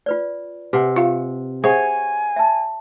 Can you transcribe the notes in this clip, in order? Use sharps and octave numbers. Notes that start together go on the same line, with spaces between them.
F4 B4 D5
C3 B4 F#5 G#5
F4 F5
G#4 C5 C#5 E5 F#5 G#5 C#6
E5 A5